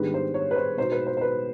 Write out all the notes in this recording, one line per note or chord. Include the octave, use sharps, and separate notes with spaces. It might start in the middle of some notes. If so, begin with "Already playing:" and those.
Already playing: G#2 D#3 G3 B3 D4 B4
C5
C#5
B4
C5
B2 G#3 B3 D#4 C5
B4
C5
C5
B4